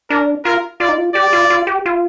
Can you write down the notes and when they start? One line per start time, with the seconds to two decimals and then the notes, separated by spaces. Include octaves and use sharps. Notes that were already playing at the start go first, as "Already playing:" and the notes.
0.10 D4 A#4
0.44 F4 A#4
0.80 F4 D5
0.89 D#4
0.98 F4
1.15 G4 D5
1.33 F4
1.50 F4
1.67 G4
1.86 F4